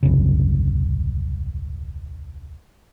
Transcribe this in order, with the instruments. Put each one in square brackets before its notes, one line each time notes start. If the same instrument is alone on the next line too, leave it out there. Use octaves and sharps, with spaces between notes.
[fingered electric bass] D#1 C2 F#2 C#3